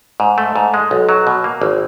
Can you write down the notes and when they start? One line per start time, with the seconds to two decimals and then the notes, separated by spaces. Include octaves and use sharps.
0.20 G#2
0.38 A3
0.56 G#2
0.74 G#3
0.91 B1
1.09 F#3
1.27 B2
1.44 A#3
1.61 G#1